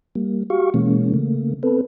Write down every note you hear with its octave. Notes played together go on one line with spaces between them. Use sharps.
G3 A#3
F#4 G4 F5 C#6
B2 E3 G#3 A#3 C#4
C#3 A3 A#3
B3 C4 A4 B4